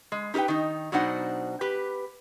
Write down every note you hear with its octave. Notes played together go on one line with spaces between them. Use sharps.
G#3
D#4 G4 A#4 B4 G5
D#3 D#4
B2 F#3 D4 D#4 C5 F#5
G4 B4